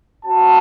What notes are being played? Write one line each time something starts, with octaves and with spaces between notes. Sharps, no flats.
C4 F#4 A5